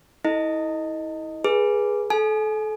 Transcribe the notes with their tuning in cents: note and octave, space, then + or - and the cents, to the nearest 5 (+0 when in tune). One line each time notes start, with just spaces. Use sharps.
E4 -35 A4 +0 D#5 +0
G#4 +0 B4 -20
A4 -30 G#5 +30